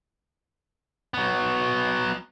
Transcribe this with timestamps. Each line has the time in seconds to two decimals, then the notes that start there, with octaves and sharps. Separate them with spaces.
1.14 F#3 B3